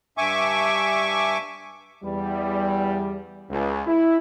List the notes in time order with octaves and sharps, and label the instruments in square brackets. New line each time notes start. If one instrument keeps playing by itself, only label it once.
[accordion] G2 E5 G#5 C#6 D6
[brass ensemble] E2 G3
C#2
E4